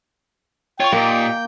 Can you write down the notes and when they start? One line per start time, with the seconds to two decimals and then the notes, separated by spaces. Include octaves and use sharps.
0.80 F4 C#5 G5 C#6
0.92 A#2 A#3 D#4 G4 D5